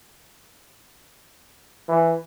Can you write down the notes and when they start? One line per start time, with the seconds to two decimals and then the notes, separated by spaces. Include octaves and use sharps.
1.89 E3